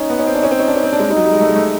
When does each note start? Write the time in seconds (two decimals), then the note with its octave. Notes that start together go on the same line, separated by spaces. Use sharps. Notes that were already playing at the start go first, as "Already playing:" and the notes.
Already playing: C#4 D#4
0.10 B3
0.19 C#4
0.27 C4
0.34 D4
0.43 C#4
0.51 C4
0.59 C#4
0.68 D4
0.76 C#4
0.84 C4
0.93 D4
1.00 G#3
1.08 G3 D#4
1.16 F#3
1.25 G3
1.33 G#3
1.41 A3
1.49 G#3
1.55 A3